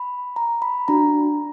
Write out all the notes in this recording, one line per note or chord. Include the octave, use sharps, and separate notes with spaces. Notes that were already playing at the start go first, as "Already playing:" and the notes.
Already playing: B5
A#5
B5
D4 F#4 A#5